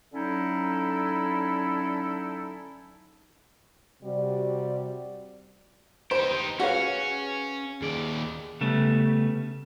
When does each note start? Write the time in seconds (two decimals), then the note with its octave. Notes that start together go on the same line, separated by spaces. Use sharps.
0.13 D3 F#3 C#4 D#4 E4 A4
4.03 C3 G3 F#4 D5
6.11 D#4 G4 C5 E7
6.60 C#4 F#4 G#4 B4 C#5 F5
7.82 D#2 G#4 D5 D7
8.61 C#3 G3 A3 B3